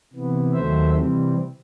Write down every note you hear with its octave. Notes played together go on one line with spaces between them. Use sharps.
C3 E3 B3
D#2 D#3 F#3 A3 C5 E5
C3 E3 G3 C4